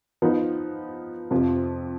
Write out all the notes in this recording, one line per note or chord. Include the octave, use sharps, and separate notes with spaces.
F3 B3 D#4
F2 C3 F3